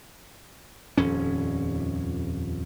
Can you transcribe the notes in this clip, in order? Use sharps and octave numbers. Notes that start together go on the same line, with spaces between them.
D#1 F2 C#4